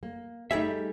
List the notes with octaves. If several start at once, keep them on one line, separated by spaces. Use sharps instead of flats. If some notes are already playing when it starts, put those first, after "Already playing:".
A#3
G3 A3 D#4 G#4 E5